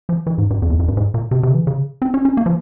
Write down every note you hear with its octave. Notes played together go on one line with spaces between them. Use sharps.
F3
E3
G#2
G2
F2
E2
F2
G2
G#2
A#2
C3
C3
C#3
E3
C#3
C4
C#4
C#4
A#3
F3